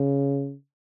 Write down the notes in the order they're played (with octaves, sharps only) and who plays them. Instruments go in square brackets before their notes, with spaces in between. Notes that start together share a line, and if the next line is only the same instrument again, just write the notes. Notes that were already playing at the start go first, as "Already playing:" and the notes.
Already playing: [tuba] C#3